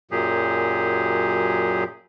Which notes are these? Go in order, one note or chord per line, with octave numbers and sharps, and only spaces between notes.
F#2 A#2 F#3 G4 G#4